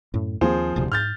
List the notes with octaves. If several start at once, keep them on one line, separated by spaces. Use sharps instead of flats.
F#2 A2
D#2 F3 A#3 C4 G#4 C5
D#1 D2 C3
G#2 F6 G6 A6